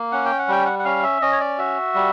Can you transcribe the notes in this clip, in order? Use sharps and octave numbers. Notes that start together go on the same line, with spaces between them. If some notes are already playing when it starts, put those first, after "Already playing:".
Already playing: A#3
C#4 F#5
G5
F#5
G3 G5
F#5
F#5
C#4 F5
E5
C#4 D#5
C#5
D5
F#4 E5
G3